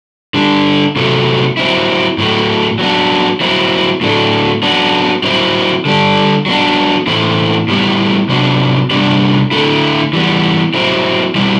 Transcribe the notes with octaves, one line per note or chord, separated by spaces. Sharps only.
D3 G3 D4
C3 F#3 A3
F#3 C4 E4
A2 F#3 A3
F#3 B3 D4
F#3 C4 E4
A2 F#3 A3 D4
F#3 B3 D4
F#3 C4 E4
D3 G3 D4
F#3 B3 D4
A2 E3 A3 C4 E4
A2 G3 B3 E4
C3 F#3 B3 D4
C3 G3 B3 D4
D3 A3 E4
E3 G3 B3
F#3 C4 E4
B2 G3 C4 E4